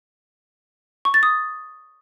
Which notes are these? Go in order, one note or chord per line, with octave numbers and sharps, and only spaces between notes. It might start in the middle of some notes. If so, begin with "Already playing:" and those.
C#6
A6
D#6